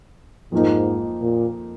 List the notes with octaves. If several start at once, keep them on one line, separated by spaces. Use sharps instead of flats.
F2 G#2 F3 A#3 D#4
A#2